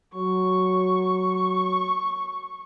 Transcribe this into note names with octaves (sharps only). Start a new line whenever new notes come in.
F#3 C#6